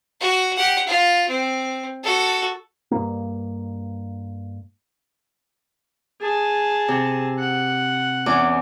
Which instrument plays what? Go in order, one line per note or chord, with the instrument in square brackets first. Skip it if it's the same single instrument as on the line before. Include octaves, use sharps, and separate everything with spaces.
[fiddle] F#4
G4 F#5
F4
C4
F#4 A4
[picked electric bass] G2 A#3
[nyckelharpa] G#4 A5
[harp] C3
[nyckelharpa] F#5
[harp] E2 C#4 D6